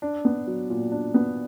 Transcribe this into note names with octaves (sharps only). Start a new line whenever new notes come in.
D4
B3
F#3
A#2
D4
B3